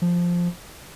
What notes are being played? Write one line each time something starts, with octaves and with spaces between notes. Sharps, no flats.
F3